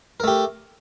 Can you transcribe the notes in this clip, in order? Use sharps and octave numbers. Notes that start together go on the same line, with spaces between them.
A3 G4 A#4